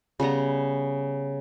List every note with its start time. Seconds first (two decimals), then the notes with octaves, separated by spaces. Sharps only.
0.20 C#3 G3 B3 A#5